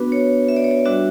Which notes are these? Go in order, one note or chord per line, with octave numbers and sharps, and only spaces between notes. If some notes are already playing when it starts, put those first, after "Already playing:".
Already playing: B3 D4 F#4 B4
C#5
E5
D5
C#5
D5
G3 D4 F#4 E5